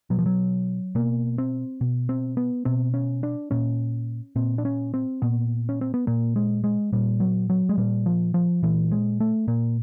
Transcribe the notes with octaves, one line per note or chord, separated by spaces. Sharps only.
B2 F#3
F3
F#3
B2 A#3
C4
B2
C4
B3
B2 C4
C#4
D4
A#2 C#4
A#2 C4
D4
C#4
C4
A#2 B3
C#4
C4
B3
A#2 A#3
G#3
G#3
A#2 G3
F#3
F#3
G#3
A#2 G3
F3
F3
A#2 E3
G#3
A3
A#2 A#3